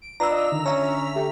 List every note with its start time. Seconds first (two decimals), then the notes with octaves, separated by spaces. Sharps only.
0.02 D7
0.20 D4 F4 B4 A#5 E6
0.31 D#5
0.52 D3 D#3
0.66 C#4 C#5 E5 A#5
1.15 A3 G4